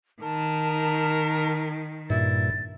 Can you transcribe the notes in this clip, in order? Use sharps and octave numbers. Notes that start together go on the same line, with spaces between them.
D#3 A#4 A5
G2 A#2 E4 A6